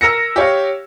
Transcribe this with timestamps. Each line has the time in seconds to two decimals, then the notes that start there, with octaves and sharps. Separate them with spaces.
0.01 A#4 E6 A#6 C#7
0.36 G4 C#5 F5